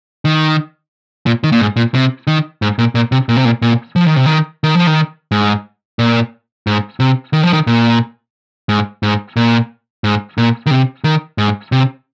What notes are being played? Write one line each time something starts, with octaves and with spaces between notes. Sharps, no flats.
D#3
A#2
D#3
A#2
G#2
A#2
C3
D#3
G#2
A#2
A#2
C3
A#2
C3
A#2
A#2
F3
D#3
C3
D#3
D#3
F3
D#3
G#2
A#2
G#2
C3
D#3
F3
D#3
A#2
G#2
G#2
A#2
G#2
A#2
D#3
C3
D#3
G#2
C3